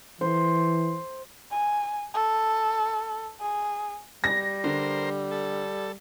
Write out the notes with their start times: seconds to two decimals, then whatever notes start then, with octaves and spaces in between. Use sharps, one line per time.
0.21 E3 C5
1.51 G#5
2.14 A4
3.40 G#4
4.24 G3 A#6
4.64 D3 A#4 C5
5.31 A4